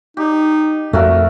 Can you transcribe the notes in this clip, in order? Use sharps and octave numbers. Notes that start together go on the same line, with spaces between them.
D#4 G4
F2 A3 F#4 A#4